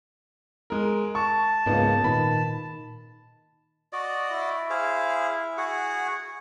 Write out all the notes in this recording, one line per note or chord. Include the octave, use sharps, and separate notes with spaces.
G#3 A#4
A5 C#6
C#2 G#2 A#3 B3 D#4
A#2 D#3 B5
F#4 D5 D#5
E4
G#4 C5 F5
F#4 G#4 F#5